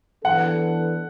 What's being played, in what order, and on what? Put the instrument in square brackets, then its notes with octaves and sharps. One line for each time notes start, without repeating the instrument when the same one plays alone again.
[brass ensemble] E3 B3 D4 A4 [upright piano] F#5